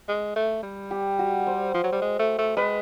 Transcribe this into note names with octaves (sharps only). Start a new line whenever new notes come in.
G#3
A3
G3
G4
F#4
C5
F3
F#3
G3
G#3
A3
A3
G#3 B4